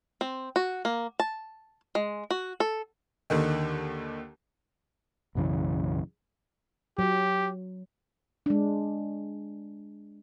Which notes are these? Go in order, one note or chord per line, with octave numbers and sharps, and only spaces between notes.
C4
F#4
A#3
A5
G#3
F#4
A4
D#2 D3 D#3
B1 F#2 C#3 E3
F#3 G4
G#3 D4